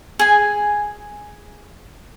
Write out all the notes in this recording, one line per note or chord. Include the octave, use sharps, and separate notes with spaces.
G#4 G#5